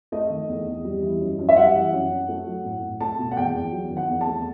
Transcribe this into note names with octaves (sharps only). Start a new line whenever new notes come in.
A3 D#5
D#3
E2
E2
G3
E3
F#2
F#2
E5
G3 F#5
E3
F#2
F#2
A3
F#3
A2
A2
A3 A5
B2
F#5
E2 G5
E2
F#3
D#3
F#5
E2
A5
A3